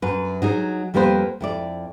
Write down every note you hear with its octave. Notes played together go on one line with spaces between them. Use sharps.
F#2 B4
F#3 D#4 G#4
F2 G3 A#3 B3 B4 C5
F2 E4 D5